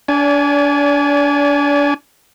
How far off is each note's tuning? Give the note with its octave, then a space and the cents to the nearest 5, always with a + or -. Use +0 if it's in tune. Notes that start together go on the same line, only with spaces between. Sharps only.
D4 -30 D5 -40 G#5 +0